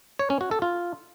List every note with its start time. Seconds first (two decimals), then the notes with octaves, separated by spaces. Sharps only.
0.19 C#5
0.30 C#4
0.41 F#4
0.51 A4
0.62 F4